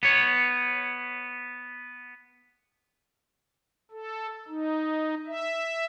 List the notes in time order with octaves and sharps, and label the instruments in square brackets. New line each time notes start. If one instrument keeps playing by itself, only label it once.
[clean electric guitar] B3 C#5
[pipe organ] A4
D#4
E5